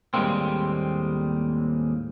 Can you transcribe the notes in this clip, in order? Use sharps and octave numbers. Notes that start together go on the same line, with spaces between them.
D#2 A2 G3 G#3 A#3 C4